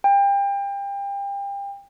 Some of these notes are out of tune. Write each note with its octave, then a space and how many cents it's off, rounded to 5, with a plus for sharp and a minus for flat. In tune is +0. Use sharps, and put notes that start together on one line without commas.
G5 +30